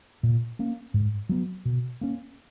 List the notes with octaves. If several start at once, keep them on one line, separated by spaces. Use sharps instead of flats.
A#2
A#3 C#4
G#2
F#3 B3
B2
A#3 C#4